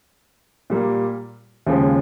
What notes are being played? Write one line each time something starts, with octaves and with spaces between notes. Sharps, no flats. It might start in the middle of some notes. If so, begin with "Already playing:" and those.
A#2 G3 A#3
D#2 C#3 F3 G#3